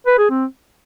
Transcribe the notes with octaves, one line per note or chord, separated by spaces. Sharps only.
B4
G#4
C4